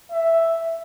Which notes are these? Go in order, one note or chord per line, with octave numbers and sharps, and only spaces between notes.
E5